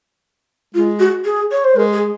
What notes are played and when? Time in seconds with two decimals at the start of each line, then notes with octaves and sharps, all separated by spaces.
0.74 G#3 F4
0.99 F#4
1.25 G#4
1.52 C#5
1.64 C5
1.76 G#3 A#4
1.93 G#4